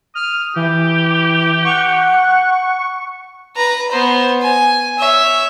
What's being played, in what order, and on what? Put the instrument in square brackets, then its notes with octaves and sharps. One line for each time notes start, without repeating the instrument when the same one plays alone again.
[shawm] D#6 [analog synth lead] F6
[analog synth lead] E3 [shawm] G4
[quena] F#5 [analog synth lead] C#6
[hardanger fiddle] B4 A#5
B3 C5
G#5
C#5 E5